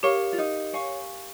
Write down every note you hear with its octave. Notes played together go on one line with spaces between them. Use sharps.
G4 A#4 C#5 F5
F4
D#4
C#5 F5 G#5 C#6